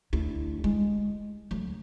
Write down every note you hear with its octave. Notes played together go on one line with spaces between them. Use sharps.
D2 E4
G#3
D2 F#3